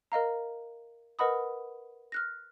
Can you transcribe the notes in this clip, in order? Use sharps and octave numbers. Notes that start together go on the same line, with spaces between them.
A#4 D#5 F5 A#5
A#4 B4 D#5 F#5 B5 D#6
F6 F#6 A#6